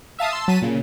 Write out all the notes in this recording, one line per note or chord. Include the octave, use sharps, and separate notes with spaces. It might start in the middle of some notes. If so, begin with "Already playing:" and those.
E5 F5 A5 D#6
A5 C6 E6
F#3 A5 B6 D#7
A#2 C#3